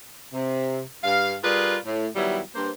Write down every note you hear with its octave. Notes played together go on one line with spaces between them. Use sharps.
C3
G2 F5
G3 F4 G#4 A#4 B4 D5
A2
D#3 F#3 G3 B3 E4
G2 A#3 C5